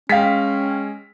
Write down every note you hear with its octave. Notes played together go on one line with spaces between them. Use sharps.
G#3 C#4 F5 G5 B6